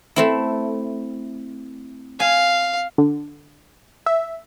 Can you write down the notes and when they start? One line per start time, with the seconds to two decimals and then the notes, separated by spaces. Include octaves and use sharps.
0.16 A3 C4 E4
2.20 F5 G#5
2.98 D3
4.06 E5